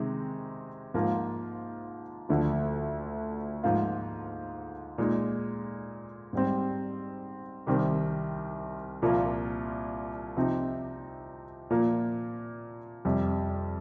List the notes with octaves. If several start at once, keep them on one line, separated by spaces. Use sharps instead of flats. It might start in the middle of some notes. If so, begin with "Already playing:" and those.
Already playing: C3 D#3 G#3 C4 D#4
G#2 F3 A#3 F4
D2 D3 F3
G#2 F3 A#3 F4
A#2 G#3 D#4
G#2 G3 C4
C2 C3 D#3 G3 C4
C2 A#2 F3 A#3 F4
C3 F3 C4 D#4
A#2 F3 A#3
F2 C3 G3